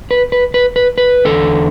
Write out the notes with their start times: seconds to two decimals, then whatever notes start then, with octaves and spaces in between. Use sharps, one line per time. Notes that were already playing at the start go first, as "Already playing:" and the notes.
0.11 B4
0.32 B4
0.54 B4
0.76 B4
0.98 B4
1.25 E2 D3 A4